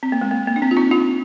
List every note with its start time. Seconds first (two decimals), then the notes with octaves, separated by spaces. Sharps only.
0.03 C4
0.12 A#3
0.21 G#3
0.31 A#3
0.48 A#3
0.56 D4
0.62 C4
0.71 F4
0.77 C4 D#4
0.91 D4 F4